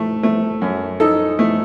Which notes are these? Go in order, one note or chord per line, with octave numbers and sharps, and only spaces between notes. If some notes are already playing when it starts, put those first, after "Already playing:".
Already playing: A3
A3
F#2
D#4 A4
A3